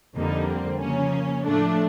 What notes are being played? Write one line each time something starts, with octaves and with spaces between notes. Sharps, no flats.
F2 D3 G3 A#3 D#4
C4
C#3 F3 A#3 C#4
A2 F3 A3 D4